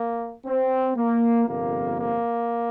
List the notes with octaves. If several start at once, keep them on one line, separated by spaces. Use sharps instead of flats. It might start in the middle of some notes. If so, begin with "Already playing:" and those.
Already playing: A#3
C4
A#3
G1 F2 C3 F3 A#3
A#3